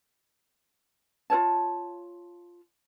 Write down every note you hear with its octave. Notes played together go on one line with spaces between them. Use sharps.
F4 A#4 C#5 A5